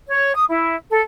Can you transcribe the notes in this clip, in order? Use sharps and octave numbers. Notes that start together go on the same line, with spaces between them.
C#5
D#6
E4
A4